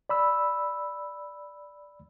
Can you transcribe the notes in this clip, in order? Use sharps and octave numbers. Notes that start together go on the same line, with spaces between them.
D5 B5 E6